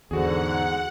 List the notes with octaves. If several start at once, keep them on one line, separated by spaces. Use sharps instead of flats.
E2 G#2 D3 F#4 G#4 F#5